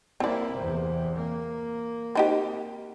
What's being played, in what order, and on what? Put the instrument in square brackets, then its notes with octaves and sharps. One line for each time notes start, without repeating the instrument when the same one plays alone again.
[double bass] A#3 E4 [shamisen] C4 D5
[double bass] E2 C3
A#3
[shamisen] C4 D#4 G4